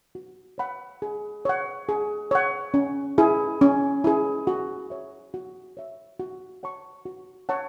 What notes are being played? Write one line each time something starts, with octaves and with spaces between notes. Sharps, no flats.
F#4
C#5 F#5 B5
G#4
C#5 F#5
G#4
C#5 F#5
C#4
E4 G#4
C#4
E4 G#4
F#4
C#5 E5
F#4
C#5 E5
F#4
C#5 F#5 A5 C#6
F#4
C#5 F#5 A5 C#6